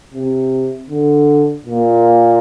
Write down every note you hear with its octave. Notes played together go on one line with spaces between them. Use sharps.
C3
D3
A#2